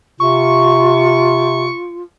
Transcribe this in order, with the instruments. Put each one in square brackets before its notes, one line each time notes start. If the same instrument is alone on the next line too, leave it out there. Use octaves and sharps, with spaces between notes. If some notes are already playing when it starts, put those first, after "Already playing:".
[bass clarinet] C3 [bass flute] F4 [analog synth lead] C#6